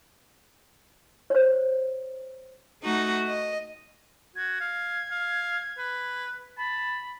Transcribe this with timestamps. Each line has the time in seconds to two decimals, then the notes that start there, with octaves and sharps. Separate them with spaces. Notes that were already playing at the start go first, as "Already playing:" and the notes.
1.30 C5 C#5
2.82 A3 D#4 F#4
3.26 D#5
4.36 F#4 G#6
4.60 F5
5.11 F5
5.78 B4
6.57 A5 B5